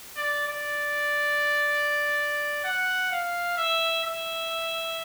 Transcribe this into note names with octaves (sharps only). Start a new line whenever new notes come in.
D5
D5
F#5
F5
E5
E5